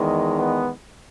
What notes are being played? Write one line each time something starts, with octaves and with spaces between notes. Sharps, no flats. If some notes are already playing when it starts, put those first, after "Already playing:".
Already playing: E2 D#3 G#3
B3